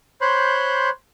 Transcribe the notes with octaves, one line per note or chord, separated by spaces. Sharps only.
C5 C#5 B5 C6 F#6 G6